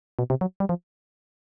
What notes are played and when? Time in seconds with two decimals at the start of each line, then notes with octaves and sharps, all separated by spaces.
0.19 B2
0.30 C3
0.41 F#3
0.60 G3
0.69 F3